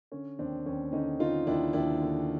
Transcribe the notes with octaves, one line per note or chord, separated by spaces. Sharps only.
D3 C#4
D#2 C4 D4
D#2 C#4
D3 C#4 D#4
D3 D#4 F4
D#2 D4 E4
D#2 D4 E4
D3